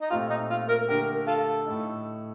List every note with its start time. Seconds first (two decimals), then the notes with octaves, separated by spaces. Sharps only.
0.01 D#4
0.10 A#2 A3 C4 F4 G4
0.30 D#4
0.50 F4
0.69 A#4
0.88 D3 A3 D4 G4 A#4
1.27 F4 A4
1.66 A2 A3 D#4